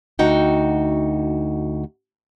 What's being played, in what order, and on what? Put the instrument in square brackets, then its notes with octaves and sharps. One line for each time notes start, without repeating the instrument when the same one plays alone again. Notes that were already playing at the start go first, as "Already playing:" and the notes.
[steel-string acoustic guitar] D2 D#4 F#4 G5